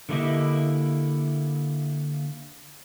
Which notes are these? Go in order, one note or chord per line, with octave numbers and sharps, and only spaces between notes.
D3 G3 A#3 E4 G4 D#5